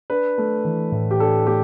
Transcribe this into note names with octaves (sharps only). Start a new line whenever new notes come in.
D4 B4
A3
E3
A2
G4
D4 A4
A3 G4